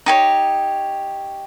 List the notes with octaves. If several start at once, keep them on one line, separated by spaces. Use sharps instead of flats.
D#4 G4 C#5